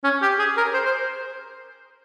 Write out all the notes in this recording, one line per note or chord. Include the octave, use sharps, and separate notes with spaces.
C#4
G4
G#4
A#4
C5
C5